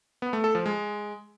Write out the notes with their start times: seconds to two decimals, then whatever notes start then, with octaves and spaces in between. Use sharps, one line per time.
0.22 B3
0.33 A3
0.44 A4
0.55 F3
0.66 G#3